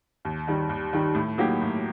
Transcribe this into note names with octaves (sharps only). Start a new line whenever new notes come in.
D#2
D#3 G3
D#2
D#3 G3
A2
F#3 A#3 D#4 G4
A2